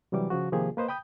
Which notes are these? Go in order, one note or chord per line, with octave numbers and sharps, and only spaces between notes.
C3 E3 F#3 G3 D6
C#3 F3 F#4
C3 D#3 F3 A#3 G4 G#4
A#3 B4 C5 D#5
G5 B5 D#6 G6